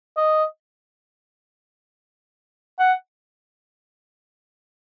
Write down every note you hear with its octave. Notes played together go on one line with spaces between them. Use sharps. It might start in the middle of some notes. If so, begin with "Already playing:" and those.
D#5
F#5